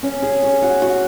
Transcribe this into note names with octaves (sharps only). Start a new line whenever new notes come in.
C#4
G#4
C#5
F#4
F#4